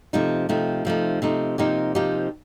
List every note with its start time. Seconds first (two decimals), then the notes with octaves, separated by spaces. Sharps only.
0.13 C3 F3 A3 D#4
0.49 C3 F3 A3 D#4
0.85 C3 F3 A3 D#4
1.22 C3 F3 A3 D#4
1.58 C3 F3 A#3 D#4 G4
1.95 C3 F3 A#3 D#4 G4